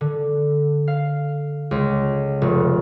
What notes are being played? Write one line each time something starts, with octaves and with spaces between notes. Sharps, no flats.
D3
F5
C#2
F1